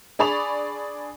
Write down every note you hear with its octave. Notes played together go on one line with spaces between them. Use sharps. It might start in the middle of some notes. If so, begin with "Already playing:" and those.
D4 G#4 D5 B5 C#6 F7